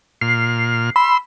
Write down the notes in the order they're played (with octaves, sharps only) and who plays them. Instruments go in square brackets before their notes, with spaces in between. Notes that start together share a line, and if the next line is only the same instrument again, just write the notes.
[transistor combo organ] A#2 F6 [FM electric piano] C7
[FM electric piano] B5 [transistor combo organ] C6 E6